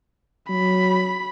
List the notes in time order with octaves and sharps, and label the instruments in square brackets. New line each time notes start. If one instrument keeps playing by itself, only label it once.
[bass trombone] F#3 [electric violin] B5